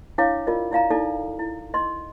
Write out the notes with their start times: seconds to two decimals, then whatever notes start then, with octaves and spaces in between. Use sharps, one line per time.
0.18 D4 E4 C#5 F5 D6
0.47 F4 A#4 D5 D#5
0.71 E4 D5 F5 A#5
0.91 D#4 E4 A4 D5
1.39 E4
1.74 D#5 C6